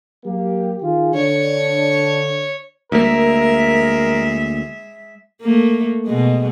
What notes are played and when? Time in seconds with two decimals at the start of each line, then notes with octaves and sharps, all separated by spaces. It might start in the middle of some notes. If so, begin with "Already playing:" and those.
0.25 F#3 A#3 G4
0.83 D#3 F4 G#4
1.15 D3 D4 C#5
2.92 D2 G#3 A#3 A#4 E5
5.42 A3 A#3
6.06 B2 G#3